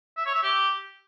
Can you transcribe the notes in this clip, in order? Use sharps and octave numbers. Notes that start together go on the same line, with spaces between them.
E5
C#5
E5
G4